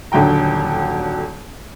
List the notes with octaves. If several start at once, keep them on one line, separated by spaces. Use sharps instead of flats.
D#1 D3 F#3 G5 A#5